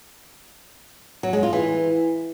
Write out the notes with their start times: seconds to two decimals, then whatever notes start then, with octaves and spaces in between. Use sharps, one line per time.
1.23 F#3
1.33 G#3
1.43 F4
1.53 E3